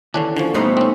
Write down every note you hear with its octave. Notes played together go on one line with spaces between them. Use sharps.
D#2 D3 E3 C#4 D4
D3 F3 C#4
A#2 G3 A3 B3 D#4 C5
C4 C#4